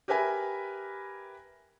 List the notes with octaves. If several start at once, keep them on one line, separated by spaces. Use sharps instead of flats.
G4 A#4 B4 E5 G#5 B5